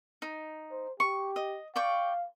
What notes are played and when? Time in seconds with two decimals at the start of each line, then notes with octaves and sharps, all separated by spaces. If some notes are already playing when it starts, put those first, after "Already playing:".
0.22 D#4
0.71 C5
1.00 G4 C#6
1.36 D#5
1.76 D5 F5 G5 C#6